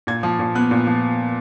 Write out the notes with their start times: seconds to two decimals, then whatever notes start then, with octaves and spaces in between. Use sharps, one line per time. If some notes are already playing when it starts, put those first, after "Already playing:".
0.07 A#2 G#6
0.23 F3
0.39 A#2
0.55 B3 F#6
0.71 A#2
0.87 F3